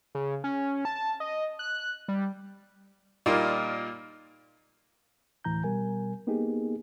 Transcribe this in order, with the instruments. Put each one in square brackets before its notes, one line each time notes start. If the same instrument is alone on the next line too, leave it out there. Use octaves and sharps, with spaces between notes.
[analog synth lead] C#3
C#4
A5
D#5
F#6
G3
[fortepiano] A#2 G3 A#3 D#4 F4
[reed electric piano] D2 A2 E3 A#5 G6
B2 G3 A#4 G#5
A#3 B3 D#4 G4 G#4